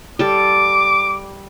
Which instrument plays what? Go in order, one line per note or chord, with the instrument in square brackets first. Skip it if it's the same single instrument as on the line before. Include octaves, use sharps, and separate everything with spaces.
[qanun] G3 A4 [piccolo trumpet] D6